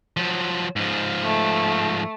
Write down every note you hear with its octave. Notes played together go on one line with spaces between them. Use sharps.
F3 F#3
G#2 F3
A3